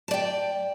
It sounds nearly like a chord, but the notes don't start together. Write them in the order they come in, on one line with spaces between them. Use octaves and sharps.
A5 D5 G5